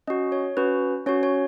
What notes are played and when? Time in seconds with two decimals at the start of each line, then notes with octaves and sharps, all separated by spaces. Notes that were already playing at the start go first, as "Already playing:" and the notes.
0.07 C#4 F#4 D#5
0.32 C#5
0.57 C#4 F#4 B4
1.06 C#4 F#4 C#5
1.23 C#5